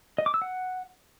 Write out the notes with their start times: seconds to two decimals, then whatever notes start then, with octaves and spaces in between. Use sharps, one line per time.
0.18 D#5
0.26 D6
0.34 E6
0.42 F#5